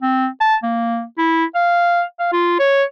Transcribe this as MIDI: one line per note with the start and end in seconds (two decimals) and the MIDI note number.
0.02 0.27 60
0.41 0.56 81
0.63 1.03 58
1.18 1.45 64
1.55 2.03 77
2.20 2.29 77
2.32 2.57 65
2.60 2.84 73